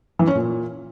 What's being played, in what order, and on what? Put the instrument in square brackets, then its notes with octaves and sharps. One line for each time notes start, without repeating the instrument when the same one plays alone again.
[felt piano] E3
C#4
A#2